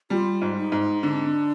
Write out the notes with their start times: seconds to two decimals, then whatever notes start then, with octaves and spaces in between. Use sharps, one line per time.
0.10 G3 F4
0.41 G#2
0.57 D#4
0.72 G#2
1.03 D3 D4
1.14 C4
1.25 D4